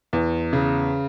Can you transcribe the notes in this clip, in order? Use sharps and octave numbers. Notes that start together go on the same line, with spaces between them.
E2
C#3